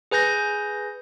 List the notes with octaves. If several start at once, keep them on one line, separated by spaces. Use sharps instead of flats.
G#4 B4 G#5 G6 A#6